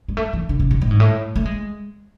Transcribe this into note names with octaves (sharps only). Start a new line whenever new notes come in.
G#3
A3
E3
D3
C#3
B2
A2
G#2
A2
A3
G#3